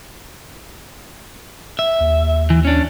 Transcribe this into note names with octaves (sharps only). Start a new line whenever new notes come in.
E5
D#2
E3
C#4 D4